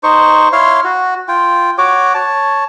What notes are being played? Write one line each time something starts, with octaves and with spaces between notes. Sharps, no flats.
D#4 C5 C#6
E4 C#5 F5 C6
F#4
F4 G5
F#4 C#5 D6
C#5 A5